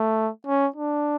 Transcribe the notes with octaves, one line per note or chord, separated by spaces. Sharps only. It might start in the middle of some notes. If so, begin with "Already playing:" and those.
Already playing: A3
C#4
D4